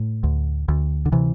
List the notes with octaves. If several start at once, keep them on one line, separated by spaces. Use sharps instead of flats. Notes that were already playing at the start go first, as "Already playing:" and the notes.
Already playing: A2
D2
D2
D3
C3 E3